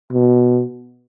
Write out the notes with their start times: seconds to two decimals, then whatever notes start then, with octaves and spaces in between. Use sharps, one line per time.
0.12 B2